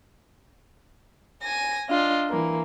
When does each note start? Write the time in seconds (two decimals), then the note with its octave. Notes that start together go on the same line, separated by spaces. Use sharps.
1.42 G#5 A#6
1.90 D4 F4 D#5
2.30 E3 A#3